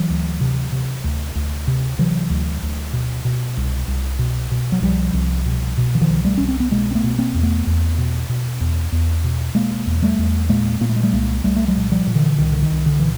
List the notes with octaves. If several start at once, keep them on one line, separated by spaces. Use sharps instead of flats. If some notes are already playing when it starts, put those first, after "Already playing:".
Already playing: E3 F#3
D2
C3
C3
D2
D2
C3
C3 E3 F#3
D2
D2
B2
B2
C2
C2
B2
B2
F#3
C2 F3 G3
C2
B2
B2
E3
D#3 F3
C2
G3 A3
C2 C#4
C4
B3
B2 G#3 A#3
C4
A3 B3
B2
A#3 C4
E2
A3 B3
E2
B2
B2
E2
E2
B2
B2 G#3 A#3
E2
G3 A3
E2
A#2 G#3 A#3
A#2 A#3
A3
G#3
G3 A3
C2 G#3 A#3
C2 G3 A3
A3
F#3 G#3
A#2
F3 G3
A#2
D3 E3
C2 D#3
D3
D#3
C2
D3
A#2 E3